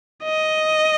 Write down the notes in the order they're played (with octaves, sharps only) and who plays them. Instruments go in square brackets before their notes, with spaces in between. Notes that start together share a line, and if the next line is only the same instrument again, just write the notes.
[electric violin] D#5